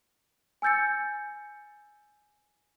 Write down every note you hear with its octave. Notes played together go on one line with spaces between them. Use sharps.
G#5 E6 G6 A6 C#7